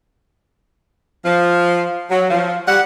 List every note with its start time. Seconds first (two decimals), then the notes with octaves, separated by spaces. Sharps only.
1.25 F3
2.11 F#3
2.30 F3
2.68 G3 F#5